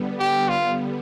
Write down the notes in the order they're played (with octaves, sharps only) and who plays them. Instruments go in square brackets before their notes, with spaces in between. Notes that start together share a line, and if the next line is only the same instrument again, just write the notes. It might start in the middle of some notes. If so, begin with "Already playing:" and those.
Already playing: [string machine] D3 G3 B3
[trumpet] G4
F4